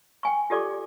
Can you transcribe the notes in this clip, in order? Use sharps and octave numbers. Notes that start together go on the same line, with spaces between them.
G5 G#5 C#6
F4 G4 A4 D5 C#6 D6